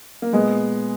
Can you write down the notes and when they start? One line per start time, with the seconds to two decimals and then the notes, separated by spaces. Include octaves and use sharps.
0.22 A#3
0.33 A#2 G#3 B3